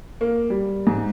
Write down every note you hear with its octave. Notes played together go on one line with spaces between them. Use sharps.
A#3
G3
G#2